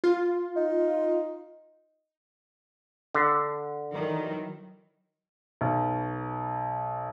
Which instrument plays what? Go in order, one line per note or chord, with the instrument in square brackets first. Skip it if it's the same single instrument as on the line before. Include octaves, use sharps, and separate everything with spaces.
[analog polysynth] F4
[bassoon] D#4
[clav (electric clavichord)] D3
[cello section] D#3 E3 F#3
[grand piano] B1